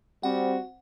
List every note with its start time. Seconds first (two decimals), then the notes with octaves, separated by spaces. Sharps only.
0.23 G3 C4 F#4 F#5